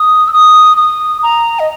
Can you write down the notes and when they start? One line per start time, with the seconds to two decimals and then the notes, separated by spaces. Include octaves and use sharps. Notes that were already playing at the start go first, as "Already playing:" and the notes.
Already playing: D#6
0.28 E6
0.33 D#6
0.77 D#6
1.23 A#5
1.59 D#5